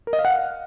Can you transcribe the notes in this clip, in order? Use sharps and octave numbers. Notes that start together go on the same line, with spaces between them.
A#4
D#5
F5
F#5
F5